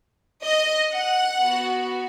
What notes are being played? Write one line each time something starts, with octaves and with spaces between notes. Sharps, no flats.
D#5
F#5
B3 F#4